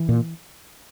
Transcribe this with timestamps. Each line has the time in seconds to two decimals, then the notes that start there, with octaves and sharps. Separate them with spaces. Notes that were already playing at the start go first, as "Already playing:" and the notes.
Already playing: E3
0.09 A#2